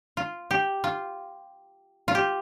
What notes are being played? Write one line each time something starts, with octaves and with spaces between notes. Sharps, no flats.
F4
G4
F4
F4
G4